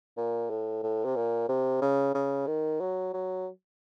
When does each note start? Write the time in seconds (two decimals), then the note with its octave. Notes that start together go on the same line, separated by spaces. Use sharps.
0.17 A#2
0.50 A2
0.83 A2
1.05 C3
1.16 A#2
1.49 C3
1.82 C#3
2.14 C#3
2.47 D#3
2.81 F#3
3.14 F#3